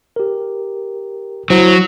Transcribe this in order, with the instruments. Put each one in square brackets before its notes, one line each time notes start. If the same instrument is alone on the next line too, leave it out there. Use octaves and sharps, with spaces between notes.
[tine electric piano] G4 A#4
[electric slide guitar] F#3 [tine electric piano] E4 C5